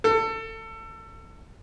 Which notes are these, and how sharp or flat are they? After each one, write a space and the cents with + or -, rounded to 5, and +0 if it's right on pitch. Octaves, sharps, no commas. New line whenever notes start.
A4 +25